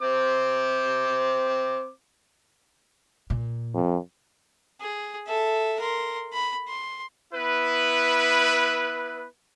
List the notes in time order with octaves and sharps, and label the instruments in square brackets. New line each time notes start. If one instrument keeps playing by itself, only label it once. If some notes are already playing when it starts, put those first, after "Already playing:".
[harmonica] C4 C5 D6
[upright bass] A#2
[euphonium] F2
[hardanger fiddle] G#4
A4 E5
A#4 C6
B5
C6
[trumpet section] B3 E4 B4